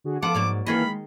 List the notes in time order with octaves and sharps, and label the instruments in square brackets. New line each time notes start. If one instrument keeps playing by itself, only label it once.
[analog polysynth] D3 F#4 G#4
[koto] F3 B3 F#5 [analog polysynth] A4 F5 A5 [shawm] D6
[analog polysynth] G#2 [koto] F#3 A#3 D5
[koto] D#3 G#4 D#5 [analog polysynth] E3 A#3 F6 [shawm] B5
[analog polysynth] G#3